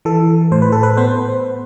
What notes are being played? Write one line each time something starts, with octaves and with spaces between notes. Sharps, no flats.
E3 A4
A2 C5
B4
A4
B4
B3 C5